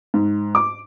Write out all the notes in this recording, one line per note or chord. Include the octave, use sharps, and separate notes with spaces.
G#2
D6